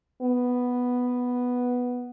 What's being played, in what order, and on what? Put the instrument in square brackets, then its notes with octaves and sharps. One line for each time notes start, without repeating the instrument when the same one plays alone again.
[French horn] B3